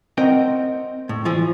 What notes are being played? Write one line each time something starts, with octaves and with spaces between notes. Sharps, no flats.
C4 A#4 D#5 F#5 G5
A2
E3 F3